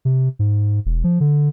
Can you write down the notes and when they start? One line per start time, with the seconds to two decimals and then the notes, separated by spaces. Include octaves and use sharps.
0.05 C3
0.39 G#2
0.86 E1
1.04 F3
1.20 D3